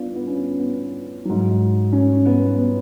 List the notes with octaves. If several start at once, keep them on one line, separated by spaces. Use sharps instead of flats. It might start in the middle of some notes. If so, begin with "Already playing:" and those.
Already playing: B3 D4 F4
B3
C#4
B3
G#2 F#3
C#4
B3
B3